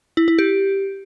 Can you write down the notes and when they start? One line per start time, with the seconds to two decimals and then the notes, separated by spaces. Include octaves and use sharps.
0.17 E4
0.28 E4
0.39 G4